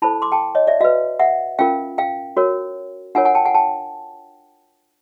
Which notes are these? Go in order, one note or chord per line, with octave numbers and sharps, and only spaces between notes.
E4 A4 C5 A5 B5
C6 D6
G5 A5
C#5 D#5
D5 E5
F#4 B4 D#5 F5
E5 F#5
C#4 F4 A#4 F5 G5
F5 G5
F#4 A#4 C#5
D4 F4 A#4 C#5 F#5 G#5
F#5 G#5
G5 A5
F#5 G#5
G5 A5